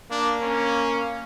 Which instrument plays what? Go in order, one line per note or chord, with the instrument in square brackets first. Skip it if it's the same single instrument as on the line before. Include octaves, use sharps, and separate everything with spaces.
[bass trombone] A#3 [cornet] D4
[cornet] C#4